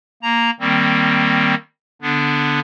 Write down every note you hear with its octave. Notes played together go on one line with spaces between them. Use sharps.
A#3 A#5
D#3 G3 A#3 C4
D3 B3 D4